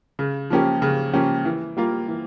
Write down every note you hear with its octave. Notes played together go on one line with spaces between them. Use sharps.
C#3
F3 A#3 C#4 G4
C#3
F3 A#3 C#4 G4
E3
G3 A#3 F4
E3